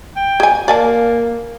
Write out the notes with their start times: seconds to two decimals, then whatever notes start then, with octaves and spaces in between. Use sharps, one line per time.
0.16 G5
0.40 G#4 G#5
0.68 A#3 D5 G#5 A5